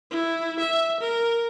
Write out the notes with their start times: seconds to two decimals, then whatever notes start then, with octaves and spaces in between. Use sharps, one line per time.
0.11 E4
0.59 E5
1.00 A#4